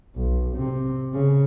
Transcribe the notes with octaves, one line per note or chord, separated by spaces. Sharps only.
B1
C3
C#3